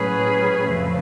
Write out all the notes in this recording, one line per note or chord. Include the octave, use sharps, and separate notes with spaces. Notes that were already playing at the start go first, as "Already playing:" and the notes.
Already playing: A2 F#3 C#4 G#4 B4
F2 C#3 F3 A3